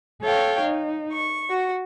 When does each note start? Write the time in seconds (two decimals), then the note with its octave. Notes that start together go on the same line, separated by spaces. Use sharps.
0.23 A4 C#5 F5 G5
0.61 D#4
1.13 C#6
1.50 F#4